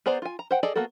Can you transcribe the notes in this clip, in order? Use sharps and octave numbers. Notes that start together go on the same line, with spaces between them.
B3 G#4 C5 D5 A#5
F4 G#5
A#5
C5 F#5 G5
G#4 A4 D5 D#5
A#3 B3 F#4 A4